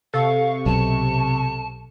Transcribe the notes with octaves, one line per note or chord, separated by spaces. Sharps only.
C3 A4 F5 C#6
B1 A5